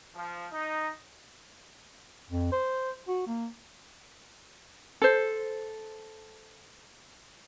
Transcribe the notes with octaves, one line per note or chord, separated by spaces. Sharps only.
F3
D#4
F2
C5
F#4
A#3
A4 C5